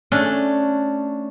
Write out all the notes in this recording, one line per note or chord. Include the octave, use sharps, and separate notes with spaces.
A3 C#4 D4